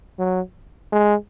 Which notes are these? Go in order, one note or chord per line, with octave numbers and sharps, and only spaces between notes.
F#3
G#3